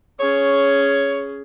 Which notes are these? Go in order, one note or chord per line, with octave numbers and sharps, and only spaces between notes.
C#4 G#4 C#5